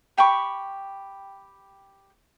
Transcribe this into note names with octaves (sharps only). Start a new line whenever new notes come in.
G4 G5 B5 C#6